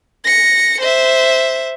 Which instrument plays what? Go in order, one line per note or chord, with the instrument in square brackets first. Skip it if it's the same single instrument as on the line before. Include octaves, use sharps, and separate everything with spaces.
[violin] A#6 C#7
C5 E5